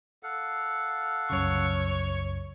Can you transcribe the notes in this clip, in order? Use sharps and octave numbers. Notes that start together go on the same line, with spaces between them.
A4 F5 F#5
C2 F#2 C#3 C#5